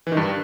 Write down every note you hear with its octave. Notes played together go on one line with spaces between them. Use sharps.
E3
D#3
G2